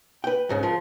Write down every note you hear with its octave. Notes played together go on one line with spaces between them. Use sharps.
B4 G5
C2 G#2 C#3
F3 F4 A#4